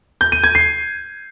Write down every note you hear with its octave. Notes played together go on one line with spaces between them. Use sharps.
G6
D#7
G#6
C7